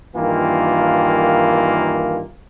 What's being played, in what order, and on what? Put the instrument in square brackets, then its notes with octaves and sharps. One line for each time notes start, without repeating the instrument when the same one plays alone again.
[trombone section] G2 D#3 E3 A#3 F4